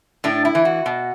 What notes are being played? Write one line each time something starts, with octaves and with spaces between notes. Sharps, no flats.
A2 D4
E4
E3
F#4
B2